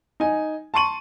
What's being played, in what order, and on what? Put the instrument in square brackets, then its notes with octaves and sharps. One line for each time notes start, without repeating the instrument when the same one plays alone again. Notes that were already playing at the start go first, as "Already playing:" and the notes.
[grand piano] D#4 G#5
A5 C6 C#6 D#7 F#7